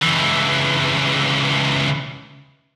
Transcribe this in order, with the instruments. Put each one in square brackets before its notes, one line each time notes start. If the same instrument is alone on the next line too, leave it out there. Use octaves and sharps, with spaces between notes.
[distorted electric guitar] C#2 E3